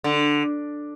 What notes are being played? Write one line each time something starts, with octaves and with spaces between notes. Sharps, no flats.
D3